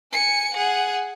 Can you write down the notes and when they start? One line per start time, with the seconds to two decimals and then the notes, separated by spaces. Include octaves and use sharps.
0.12 G#5 C#7
0.54 G#4 F#5